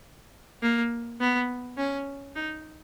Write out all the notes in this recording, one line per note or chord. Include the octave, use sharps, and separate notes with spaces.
A#3
B3
C#4
D#4